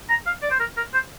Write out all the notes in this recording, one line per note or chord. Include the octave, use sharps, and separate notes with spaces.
A#5
F5
D5
C5
A#4
A#4
C5